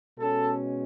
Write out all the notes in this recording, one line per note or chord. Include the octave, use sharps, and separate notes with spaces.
B2 G#3 C#4 A4